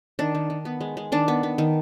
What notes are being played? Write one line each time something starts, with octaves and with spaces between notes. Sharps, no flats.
D#3 D4
D#3
D#3
B3
G#3
G#3
D#3 D4
B3
B3
D#3